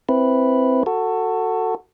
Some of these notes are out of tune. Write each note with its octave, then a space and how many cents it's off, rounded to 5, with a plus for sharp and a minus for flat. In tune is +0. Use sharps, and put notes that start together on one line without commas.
C4 +0 E4 +0 B4 +0
F#4 +0 A4 +20